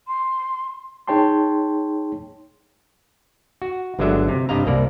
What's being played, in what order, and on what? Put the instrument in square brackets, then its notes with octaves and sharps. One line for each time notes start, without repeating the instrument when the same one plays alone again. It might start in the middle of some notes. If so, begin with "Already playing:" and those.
[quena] C6
[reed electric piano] D#4 G#4 C#5 G5 A5 C6
[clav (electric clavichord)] F#4
G1 D3 F#3 G#3 E5
C3
G2 C3 D#5 F5 A#5
C2 A#3 D5